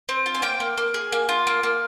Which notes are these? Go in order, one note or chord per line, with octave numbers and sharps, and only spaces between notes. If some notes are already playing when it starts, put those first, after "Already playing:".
C4
F4
G#5
A#3 G5
A#3
A#3
G#4
A#3
F4
A#3
A#3